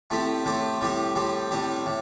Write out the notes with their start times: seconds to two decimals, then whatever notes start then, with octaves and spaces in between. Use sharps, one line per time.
0.10 A2 A3 C4 G4
0.45 A2 A3 C4 G4
0.81 A2 G3 C4 G4
1.15 A2 G3 C4 G4
1.51 A2 G3 C4 G4
1.86 A2